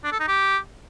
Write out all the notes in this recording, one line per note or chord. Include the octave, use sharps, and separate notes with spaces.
D4
A4
D#4
G4